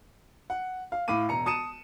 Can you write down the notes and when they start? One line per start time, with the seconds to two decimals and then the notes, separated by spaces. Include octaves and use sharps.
0.50 F#5
0.92 F5
1.08 A2 F5 D6 D#7
1.29 E1 A#5 C#7
1.46 A5 D#6 C#7 D#7 E7